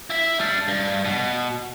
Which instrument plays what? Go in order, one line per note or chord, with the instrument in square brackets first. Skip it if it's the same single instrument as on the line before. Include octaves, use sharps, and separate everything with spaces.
[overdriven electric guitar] E4 E5
G3 D4
G2
B2